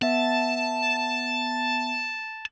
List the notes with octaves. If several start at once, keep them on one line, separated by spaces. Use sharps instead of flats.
B3 E5 A5